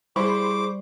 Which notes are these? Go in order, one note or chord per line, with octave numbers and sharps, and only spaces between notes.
G3 E4 G#4 C5 B5 C#6 D6